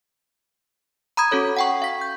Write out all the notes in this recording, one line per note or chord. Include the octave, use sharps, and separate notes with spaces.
A#5 B5 D#6 G#6
C#4 F#4 A4 C#5
F#5 G5 C#6
F5 B6
G6